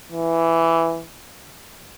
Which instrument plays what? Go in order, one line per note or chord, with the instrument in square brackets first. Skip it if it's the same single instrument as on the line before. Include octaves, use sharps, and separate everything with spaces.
[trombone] E3